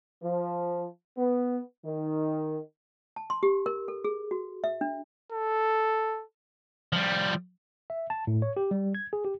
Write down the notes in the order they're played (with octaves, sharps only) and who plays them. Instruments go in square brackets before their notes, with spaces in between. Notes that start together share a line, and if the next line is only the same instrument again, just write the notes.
[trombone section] F3
B3
D#3
[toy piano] A5
C6
G4
A#4
A4
G#4
F#4
E5
D4
[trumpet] A4
[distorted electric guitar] F3 G3
[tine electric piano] E5
A5
A2
C#5
G4
G3
G#6
G#4
G4